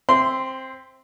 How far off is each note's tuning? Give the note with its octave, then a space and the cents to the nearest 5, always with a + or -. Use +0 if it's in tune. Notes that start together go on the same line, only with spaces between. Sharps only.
C4 +10 E5 +0 C6 -15